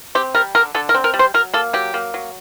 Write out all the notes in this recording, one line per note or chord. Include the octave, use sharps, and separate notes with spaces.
C4 G4
G3 A#4
D3 A#4
D3 A4
A#4
C4
A#4
G3
C5
F#3 A#4
A#3 A4
F#3 G4
A#3
F#3